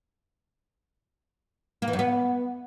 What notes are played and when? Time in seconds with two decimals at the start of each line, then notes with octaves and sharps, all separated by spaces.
1.82 A#3
1.88 E3
1.93 F#2
1.99 B3